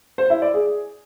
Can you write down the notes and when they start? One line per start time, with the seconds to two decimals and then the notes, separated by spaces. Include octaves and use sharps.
0.18 C5
0.30 E4
0.42 D5
0.54 G#4